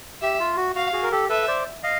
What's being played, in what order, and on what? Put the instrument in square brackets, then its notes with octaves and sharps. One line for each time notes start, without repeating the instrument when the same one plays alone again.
[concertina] G4 [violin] E5
[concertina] F4
F#4
[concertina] F#4 [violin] F5
[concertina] F#4 G#4
A#4
G4 A4
[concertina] A4 B4 [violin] E5
[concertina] C5 D5
D#5 F5